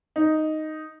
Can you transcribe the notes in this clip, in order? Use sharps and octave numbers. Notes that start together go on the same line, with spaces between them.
D#4